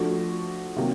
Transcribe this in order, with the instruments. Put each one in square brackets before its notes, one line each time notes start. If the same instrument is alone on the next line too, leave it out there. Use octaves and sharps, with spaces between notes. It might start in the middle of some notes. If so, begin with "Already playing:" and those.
Already playing: [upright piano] F3 A3 D4 F#4
C3 D#3 F#3 A#3